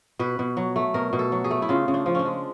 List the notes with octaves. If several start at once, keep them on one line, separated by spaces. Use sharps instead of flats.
B2 B4
B2
F#3
A3
B2 A#4
B2
A4
F#3
G#4
A3
E4
C#3 F4
C#3
D4
F3
C#4 D4
G#3